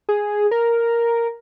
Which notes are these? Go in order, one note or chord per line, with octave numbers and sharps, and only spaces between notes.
G#4
A#4